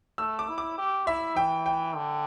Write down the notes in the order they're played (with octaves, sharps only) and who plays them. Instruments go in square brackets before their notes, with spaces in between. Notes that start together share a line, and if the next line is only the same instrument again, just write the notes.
[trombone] A3 [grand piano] E6
[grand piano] D6
[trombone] E4
[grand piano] D6
[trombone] G4
[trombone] E4 [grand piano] E5
[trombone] E3 [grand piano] G5
[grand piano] G5
[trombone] D3